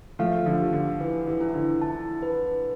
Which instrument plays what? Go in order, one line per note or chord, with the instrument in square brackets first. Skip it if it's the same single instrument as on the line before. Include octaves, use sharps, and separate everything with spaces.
[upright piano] F3 A3 [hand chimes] F5
[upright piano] D3 F3
[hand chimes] G4
[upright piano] D3
[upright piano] E3 [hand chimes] B4
[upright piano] E3
[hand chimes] E4
[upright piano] D3
[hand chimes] A5
B4